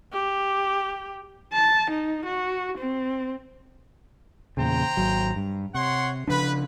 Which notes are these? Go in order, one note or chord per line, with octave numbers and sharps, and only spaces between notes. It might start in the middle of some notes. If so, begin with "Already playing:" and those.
G4
A5
D#4
F#4
C4
E2 A#2 C#3 C5 G5 A#5
G#1 F#3
G2
C3 C#5 F#5 C6
C#3 F3 D4 B4